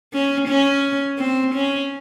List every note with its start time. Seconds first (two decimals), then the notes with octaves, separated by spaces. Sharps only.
0.13 C#4
0.48 C#4
1.19 C4
1.55 C#4